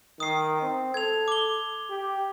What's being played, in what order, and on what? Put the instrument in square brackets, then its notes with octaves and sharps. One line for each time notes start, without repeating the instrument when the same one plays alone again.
[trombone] D#3 [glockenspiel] D#6 C7
[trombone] C4
[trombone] A4 [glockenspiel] G#6 F7
[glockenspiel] D6 G7
[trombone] G4